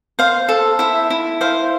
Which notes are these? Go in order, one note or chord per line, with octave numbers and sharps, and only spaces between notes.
C5 F5
A4
E4 E5
E4
C5 F5